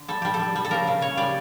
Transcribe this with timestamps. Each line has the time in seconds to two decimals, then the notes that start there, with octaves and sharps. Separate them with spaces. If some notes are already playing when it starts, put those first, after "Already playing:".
Already playing: D3
0.08 G3 A4
0.22 G3 G4
0.34 A4
0.39 G3
0.55 G3
0.65 A4
0.71 C#3 A#4
0.87 C#3
1.01 C#3 C#5
1.17 G3 D5